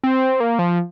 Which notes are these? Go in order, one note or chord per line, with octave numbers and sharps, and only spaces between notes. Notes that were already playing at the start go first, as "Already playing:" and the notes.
C4
A#3
F3